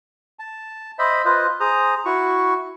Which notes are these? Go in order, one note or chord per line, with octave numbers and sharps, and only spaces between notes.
A5
C5 D#5 E5 B5
F4 B4 C5 D#5
G#4 C5 A#5 D#6
E4 F#4 C#6